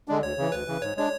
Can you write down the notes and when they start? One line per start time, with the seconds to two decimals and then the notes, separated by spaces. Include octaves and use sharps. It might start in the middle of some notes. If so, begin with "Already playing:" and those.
0.08 D3 G#3 D4
0.23 D2 C#5
0.38 C#3 E3
0.52 D2 B4
0.67 C#3 E3
0.82 G#2 C#5
0.97 G#3 D4 C#5